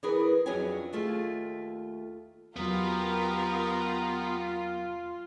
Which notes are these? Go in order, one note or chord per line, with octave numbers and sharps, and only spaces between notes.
E3 B3 G#4 A#4 B4
F2 F#3 C#4 D4 G#4 G#5
D#2 A3 F4 G#4
E2 F#3 B3 F4 G4 A#4 A#5